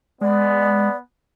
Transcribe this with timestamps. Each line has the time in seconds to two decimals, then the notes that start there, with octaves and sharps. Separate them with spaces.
0.21 G#3 B3 D5